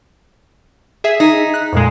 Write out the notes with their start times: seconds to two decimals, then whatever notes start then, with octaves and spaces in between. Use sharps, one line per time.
1.04 G#4 E5 B6
1.20 D#4
1.54 F#6
1.73 F2 A#2 G#3